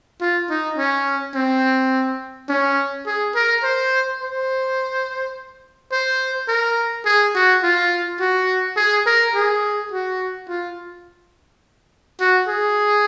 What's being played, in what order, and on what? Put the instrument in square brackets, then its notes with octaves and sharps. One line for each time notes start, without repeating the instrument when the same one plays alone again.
[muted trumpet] F4
D#4
C#4
C4
C#4
G#4
A#4
C5
C5
C5
A#4
G#4
F#4
F4
F#4
G#4
A#4
G#4
F#4
F4
F#4
G#4